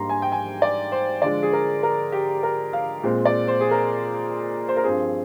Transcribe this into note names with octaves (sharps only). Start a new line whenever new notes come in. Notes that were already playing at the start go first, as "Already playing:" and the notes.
Already playing: G#2 G3 A#3 D4 A#5 C6
G#5
G5
G#5
D5
C5
D3 F3 G#3 D5
G#4
A#4
A#4
G4
A#4
F5
A#2 G#3 C4
D5
C5
G#4
A#4
C5
A#4
G2 F3 C4 G#4